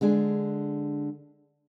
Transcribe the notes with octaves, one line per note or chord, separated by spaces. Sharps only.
D3 G#3 D4 G#4